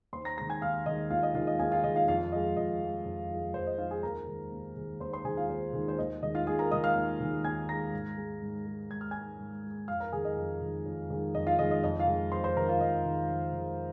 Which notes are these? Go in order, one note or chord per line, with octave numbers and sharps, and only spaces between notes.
D#2 C5 C6
A#5 A#6
D#3 G#3 A#5 A#6
G#5 G#6
D#2 F5 F6
D#3 G#3 D#5
D#2 F4 F5
D#5
D#3 G#3 F4 F5
D#5
D#2 G#4 G#5
F4 F5
D#3 G#3 D#5
F4 F5
F2 F4 F5
F3 G#3 D#5
F2 D#5
F3 G#3
F2
F3 G#3
F2 C5
D#5
F3 G#3 F4 F5
G#4 G#5
D#2 A#4 A#5
D#3 G#3
D#2
D#3 G#3
D#2 C5 C6
C5 C6
D#3 G#3 G#4 G#5
F4 F5
D#2 C5
D#3 G#3
C5
D#2 D#5
D#3 G#3 D#5
F4 F5
D#2 G#4 G#5
A#4 A#5
D#3 G#3 D#5 D#6
F5 F6
D#2
D#3 G#3
D#2 G#5 G#6
D#3 G#3 A#5 A#6
G#2
G#3
G#2
G#3
G#2 G#6
F6
G#3 G#5 G#6
G#2
G#3
F2 F5 F6
A#4 A#5
D#3 G#3 G#4 G#5
D#5
F2
D#3 G#3
F2
D#3 G#3
F2 D#5
F4 F5
D#3 G#3 D#5
D#5
F2 D#5
F4 F5
D#3 G#3
F2 C5 C6
C5 C6
D#3 G#3 A#4 A#5
F4 F5
F2 D#5
D#3 G#3
F2
D#3 G#3